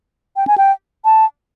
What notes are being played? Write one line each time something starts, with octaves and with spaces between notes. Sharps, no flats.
G5
G#5
G5
A5